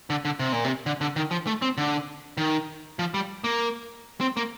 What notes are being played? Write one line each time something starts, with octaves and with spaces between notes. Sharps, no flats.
D3
D3
C3
A#2
C3
D3
D3
D#3
F3
A3
C4
D3
D#3
F3
G3
A#3
C4
A#3